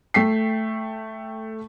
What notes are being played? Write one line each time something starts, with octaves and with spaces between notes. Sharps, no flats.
A3 G5 B6 C7